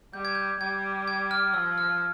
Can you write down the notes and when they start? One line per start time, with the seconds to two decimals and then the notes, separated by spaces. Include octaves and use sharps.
0.13 G3 G6
0.25 G#6
0.35 G6
0.60 G3 G#6
1.08 G#6
1.31 F6
1.54 F3 E6
1.78 F6